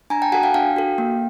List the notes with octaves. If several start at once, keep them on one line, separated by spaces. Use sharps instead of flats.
D4 G#5 A#5
G5 A5
F#4 A4 F#5 G#5
F5 G5
D4 F5 G5
F#4 A4
A#3